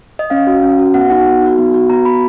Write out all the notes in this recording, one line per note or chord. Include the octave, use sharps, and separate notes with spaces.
D#5
C#4 F5
F#4
C#4
F#4
B3 F#5
D#4 F#4 F#5
B3
D#4 F#4
B3
F#4
B3 A#5
F#4 B5